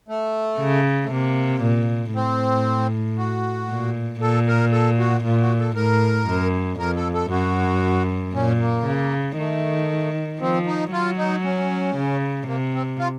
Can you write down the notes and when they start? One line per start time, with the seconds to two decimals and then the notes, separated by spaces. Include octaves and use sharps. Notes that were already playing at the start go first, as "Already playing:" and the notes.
0.08 A3
0.59 C#3
1.04 A3
1.11 C3 A#3
1.62 A#2
2.14 A2 C4
3.18 F#4
3.69 A#2
4.21 A#2 A4
4.47 A#4
4.72 A4
4.99 F#4
5.24 A#2 F4
5.41 F#4
5.59 A4
5.76 A2 A#4
6.27 F#2
6.79 F2 A#4
6.96 A4
7.14 A4
7.31 F#2 F#4
8.33 A#2 C#4
8.60 A#3
8.86 C#3
9.38 D#3 A3
10.40 F3 C4
10.66 D#4
10.92 F#3 F4
11.18 D#4
11.45 C#4
11.96 C#3
12.47 C3 A#3
12.74 C4
12.99 F4